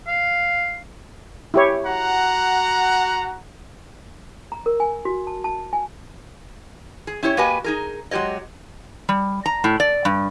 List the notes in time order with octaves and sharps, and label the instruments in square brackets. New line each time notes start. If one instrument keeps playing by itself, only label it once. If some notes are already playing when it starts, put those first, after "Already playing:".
[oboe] F5
[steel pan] E4 G4 C#5
[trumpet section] F#4 F#5 A#5
[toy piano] A#5
A#4
G#5
F#4
A5
A5
G#5
[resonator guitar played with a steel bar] G#4
C#4 E4 G4 C5 C#5
A#3 F#4 G4 B4 D#5 G#5
D#4 G#4 A#4
F#3 G#3 G4 C#5 D#5
G3
A#5
A2
D5
G2